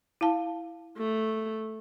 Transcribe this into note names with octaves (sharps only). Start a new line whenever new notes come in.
E4 F5 A5
A3